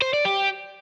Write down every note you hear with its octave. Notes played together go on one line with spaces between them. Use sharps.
C5
D5
G4